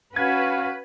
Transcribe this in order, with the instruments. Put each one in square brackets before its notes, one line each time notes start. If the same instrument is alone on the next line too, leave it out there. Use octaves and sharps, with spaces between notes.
[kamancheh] C#4 F#4 [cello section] B4 [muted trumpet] F5 [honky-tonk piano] G#6